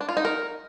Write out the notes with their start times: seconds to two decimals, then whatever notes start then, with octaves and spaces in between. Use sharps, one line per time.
0.01 D4
0.09 F4
0.17 D#4
0.25 A#4